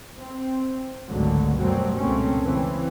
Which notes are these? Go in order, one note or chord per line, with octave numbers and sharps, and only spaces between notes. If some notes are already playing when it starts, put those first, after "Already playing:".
C4
G#1 C#2 G#2 D3 F#3 A3
F#2 B2 F#3 G3 A3 C4
C#2 A#2 A3 A#3 C4 C#4
C#3 E3 C4